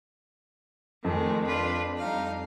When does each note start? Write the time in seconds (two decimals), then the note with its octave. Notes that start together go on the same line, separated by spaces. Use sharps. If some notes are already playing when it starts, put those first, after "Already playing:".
1.05 F2 D#3 G#3 A3
1.46 D4 F4 B4
1.98 G3 D#4 F5